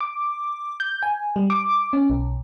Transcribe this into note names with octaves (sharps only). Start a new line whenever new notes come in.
D6
G6
G#5
G3
D6
C#4
B1